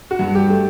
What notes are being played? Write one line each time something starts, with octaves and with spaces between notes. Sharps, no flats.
F#4
G2
G4
A3